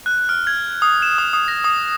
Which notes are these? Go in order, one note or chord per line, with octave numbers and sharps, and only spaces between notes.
F#6
F6
G#6
D#6
E7
D#6
D#6
A#6
D#6